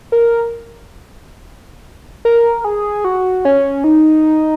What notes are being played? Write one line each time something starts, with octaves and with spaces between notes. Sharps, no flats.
A#4
A#4
G#4
F#4
C#4
D#4